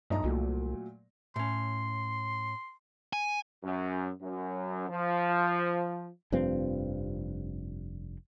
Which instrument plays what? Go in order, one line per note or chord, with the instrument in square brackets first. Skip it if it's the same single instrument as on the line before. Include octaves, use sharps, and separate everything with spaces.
[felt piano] B1 D#5 A#5 [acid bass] G2
[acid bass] C2 [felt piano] A#2 F#3 A3
[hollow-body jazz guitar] A2 C#4 [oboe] C6
[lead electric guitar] G#5
[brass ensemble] F#2
F#2
F3
[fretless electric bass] F1 G2 F3 C4